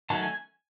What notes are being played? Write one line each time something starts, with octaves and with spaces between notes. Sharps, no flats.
D#3 F#3 A3 C#4 A5
G#5